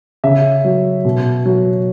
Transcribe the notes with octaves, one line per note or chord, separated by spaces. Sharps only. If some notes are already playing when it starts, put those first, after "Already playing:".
C#3 E5
F#3
B2
F#3